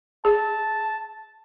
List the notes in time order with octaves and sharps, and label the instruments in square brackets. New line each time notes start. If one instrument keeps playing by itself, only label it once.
[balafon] G#4 [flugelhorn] A5